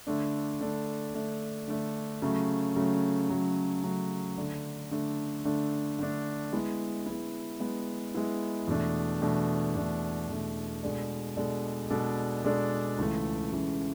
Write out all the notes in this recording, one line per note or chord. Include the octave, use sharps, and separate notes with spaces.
D3 A3 D4
D3 A3 D4
D3 A3 D4
D3 A3 D4
C#3 F#3 A3
C#3 F#3 A3
C#3 F#3 A3
C#3 F#3 A3
D3 A3 D4
D3 A3 D4
D3 A3 D4
D3 A3 D4
G#3 B3 E4
G#3 B3 E4
G#3 B3 E4
G#3 B3 E4
E2 B2 A3 D4
E2 B2 A3 D4
E2 B2 A3 D4
E2 B2 A3 D4
B2 G#3 D4 A4 D5
B2 G#3 D4 A4 D5
B2 G#3 D4 A4 D5
B2 G#3 D4 A4 D5
C#2 C#3 E3 A3
C#2 C#3 E3 A3